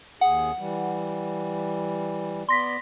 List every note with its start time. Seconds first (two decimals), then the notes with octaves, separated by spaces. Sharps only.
0.21 D#2 G#4 F#5
0.59 E3 G3
2.49 B3 D5 C6 A#6 B6